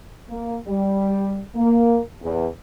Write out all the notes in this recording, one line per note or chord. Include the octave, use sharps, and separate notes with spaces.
A#3
G3
A#3
E2